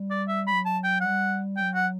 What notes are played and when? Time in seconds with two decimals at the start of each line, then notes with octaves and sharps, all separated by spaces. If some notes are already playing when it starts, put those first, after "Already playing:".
Already playing: G3
0.11 D5
0.28 E5
0.47 F#3 B5
0.66 A5
0.84 G5
1.01 G3 F#5
1.56 F#3 G5
1.74 F#5